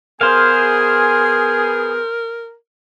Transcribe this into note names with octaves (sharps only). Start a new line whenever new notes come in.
B3 G#4 A#4 C5 F5 G#5